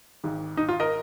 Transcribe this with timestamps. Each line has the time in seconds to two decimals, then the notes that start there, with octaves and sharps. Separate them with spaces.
0.24 G#1 G#2 D#3
0.57 D#4
0.69 F4
0.80 A#4 D#5